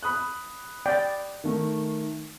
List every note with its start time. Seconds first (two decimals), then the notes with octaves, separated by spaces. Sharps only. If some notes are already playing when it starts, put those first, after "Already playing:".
0.03 B5 D#6 F#6
0.86 D5 G5
1.44 D#3 A3